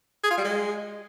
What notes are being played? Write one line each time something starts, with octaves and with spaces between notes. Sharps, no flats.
G#4
F4
G3
G#3